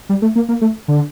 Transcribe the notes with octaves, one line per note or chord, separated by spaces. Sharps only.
G3
A3
A#3
A#3
A3
D3